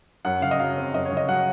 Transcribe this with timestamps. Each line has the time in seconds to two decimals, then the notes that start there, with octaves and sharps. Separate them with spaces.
0.25 F#2 F#5
0.42 C#3 F5
0.51 D#5
0.60 F#3 F5
0.77 C4
0.93 F#2 D#5
1.05 C#5
1.11 C#3
1.17 D#5
1.29 F#3 F#5